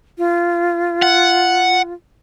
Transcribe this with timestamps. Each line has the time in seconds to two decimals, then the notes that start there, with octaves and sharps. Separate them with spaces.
0.18 F4
1.02 F#5